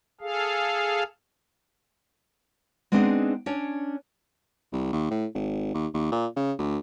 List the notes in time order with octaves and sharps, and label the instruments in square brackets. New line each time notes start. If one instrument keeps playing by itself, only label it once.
[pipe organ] G#4 A4 F5
[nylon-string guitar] G#3 B3 C4 D4 D#4 G#4
C#4 D4 C#5
[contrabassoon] C2
D#2
A2
G#1
D#2
D#2
A#2
C#3
D2